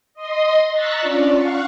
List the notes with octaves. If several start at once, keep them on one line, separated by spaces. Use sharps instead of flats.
D#5 C6 D#6
A#5 C#6 E6 F#6 A6 B6
C#4 D4 F4 D5
F5 F#5 C#6